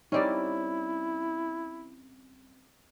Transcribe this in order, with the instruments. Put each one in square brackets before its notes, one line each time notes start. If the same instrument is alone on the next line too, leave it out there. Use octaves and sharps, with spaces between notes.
[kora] G3 C4 C#4 [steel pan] D#4 D5 [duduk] E4